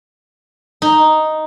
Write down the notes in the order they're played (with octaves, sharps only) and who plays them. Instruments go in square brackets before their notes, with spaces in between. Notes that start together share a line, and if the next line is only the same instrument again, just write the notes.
[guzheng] D#4